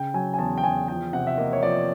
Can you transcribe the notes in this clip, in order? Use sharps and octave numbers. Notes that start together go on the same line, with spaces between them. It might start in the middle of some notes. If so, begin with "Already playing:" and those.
Already playing: C#3 G5
F#3 G#5
G#5
E2 A5
G5
E2 G#5
F3 G5
C3 F#5
E5
A#3 D#5
C#5
F3 D5